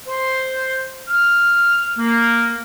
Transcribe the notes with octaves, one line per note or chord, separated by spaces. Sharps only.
C5
F6
A#3